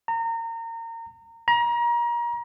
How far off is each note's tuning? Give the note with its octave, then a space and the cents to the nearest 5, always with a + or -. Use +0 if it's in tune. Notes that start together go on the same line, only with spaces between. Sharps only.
A#5 -30
A#5 +30